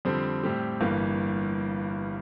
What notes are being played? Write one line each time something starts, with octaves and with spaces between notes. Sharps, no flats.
F2 D3 G3 C4
A2 G3 C4 G4
G1 G2 E3 A#3